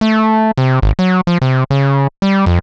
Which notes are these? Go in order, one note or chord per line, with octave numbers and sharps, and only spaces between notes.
A3
C3
G#1
F#3
F3
C3
C#3
G3
F2